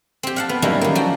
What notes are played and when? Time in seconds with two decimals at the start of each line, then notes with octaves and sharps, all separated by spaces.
0.23 C4 G4
0.36 F5 F#5 A5
0.49 B3
0.62 F#3 G3 A#3 C#4 D#4 E4
0.81 D#3 A#3
0.95 F3 F#4 G5